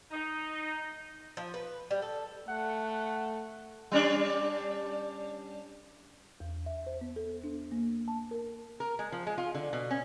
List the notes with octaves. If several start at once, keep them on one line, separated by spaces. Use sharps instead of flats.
D#4
F3
B4
G3
A4
A3 F#5
G3 C#4 D4
E2
E5
C5
B3
A4
D4
A#3
A5
A#4
A#4
G#3
F3
G#3
F4
D3
B2
C#4